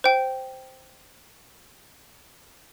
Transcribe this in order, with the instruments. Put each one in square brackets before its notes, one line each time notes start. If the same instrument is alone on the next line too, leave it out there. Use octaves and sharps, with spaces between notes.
[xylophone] C5 G5